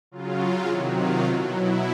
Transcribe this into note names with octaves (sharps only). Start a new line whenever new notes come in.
C#3 F#3 F4
C3 D#3 F#3 E4
F4
B2 E4 F#4
F#3
E4